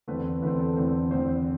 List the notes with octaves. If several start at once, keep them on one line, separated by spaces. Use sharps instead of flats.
E2 D3 A3 C4 B4
E2 D3 A3 C4 B4
A4
E2 D3 A3 C4
E2 D3 A3 C4 C5
C5